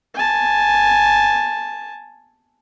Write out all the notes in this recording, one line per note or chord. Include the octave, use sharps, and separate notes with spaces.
G#5 A5